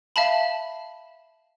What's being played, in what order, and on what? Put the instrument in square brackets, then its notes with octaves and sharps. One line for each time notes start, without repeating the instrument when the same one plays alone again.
[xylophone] E5 F5 A5 B5